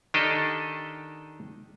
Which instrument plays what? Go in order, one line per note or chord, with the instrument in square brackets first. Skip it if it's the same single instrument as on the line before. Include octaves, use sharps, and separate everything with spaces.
[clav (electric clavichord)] D#3 D4 G4 A4 D#5